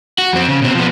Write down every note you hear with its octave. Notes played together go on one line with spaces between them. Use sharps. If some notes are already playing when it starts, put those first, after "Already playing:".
F#4
F2 C4
C#3
B2 C4
F3 B3